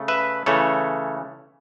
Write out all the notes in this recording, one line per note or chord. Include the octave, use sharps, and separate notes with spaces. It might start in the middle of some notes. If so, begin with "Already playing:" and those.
Already playing: C#3 A3
B4 E5
C#3 E3 A3 A4 C#5